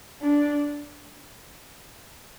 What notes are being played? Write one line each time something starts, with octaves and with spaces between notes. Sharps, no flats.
D4